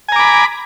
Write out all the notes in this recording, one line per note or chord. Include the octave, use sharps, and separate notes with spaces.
G#5 A#5 B5 D6